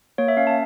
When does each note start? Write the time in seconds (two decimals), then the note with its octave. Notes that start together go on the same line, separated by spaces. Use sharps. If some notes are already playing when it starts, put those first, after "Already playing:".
0.18 A#3 C#5
0.28 E5
0.37 C#4 F5
0.47 A5